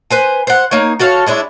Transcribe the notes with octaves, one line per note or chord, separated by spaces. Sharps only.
B4 C5 G#5
C5 F#5
A#3 D#4 C#5
F#4 A4 C#5 F5
G#3 C#4 D4 E4